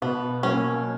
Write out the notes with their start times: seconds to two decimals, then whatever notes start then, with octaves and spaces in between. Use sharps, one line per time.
0.02 B2 B3
0.43 F#3 A#3 C#4